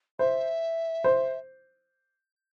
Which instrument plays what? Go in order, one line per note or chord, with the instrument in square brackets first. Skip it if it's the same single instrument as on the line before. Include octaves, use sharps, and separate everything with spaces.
[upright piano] C5 [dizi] E5
[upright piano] C5